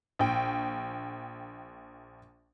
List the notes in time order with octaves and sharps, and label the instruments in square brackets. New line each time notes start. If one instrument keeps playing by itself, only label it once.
[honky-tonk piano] A#1 G5